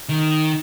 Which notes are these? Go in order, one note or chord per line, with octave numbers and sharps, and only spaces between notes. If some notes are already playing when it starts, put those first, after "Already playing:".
D#3